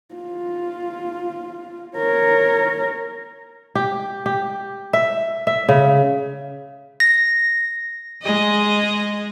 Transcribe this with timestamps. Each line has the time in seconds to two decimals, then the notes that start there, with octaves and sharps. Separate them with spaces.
0.15 F4
1.97 A#4 C#5
3.75 G4
4.26 G4
4.93 E5
5.47 E5
5.69 C#3
7.00 A#6
8.23 G#3 D#5